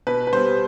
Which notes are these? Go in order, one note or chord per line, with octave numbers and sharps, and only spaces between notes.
B2 B4
B4
G3 B3 C5